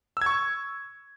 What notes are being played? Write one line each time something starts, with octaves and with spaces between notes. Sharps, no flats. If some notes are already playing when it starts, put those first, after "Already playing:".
C#6 E6 G#6